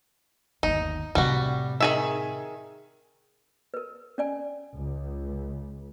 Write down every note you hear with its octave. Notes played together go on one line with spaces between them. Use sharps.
G1 D#2 D#4
A2 C3 G3 F#4
D#3 G#4 E5
A#4 B4
C#4 D5 G#5
C#2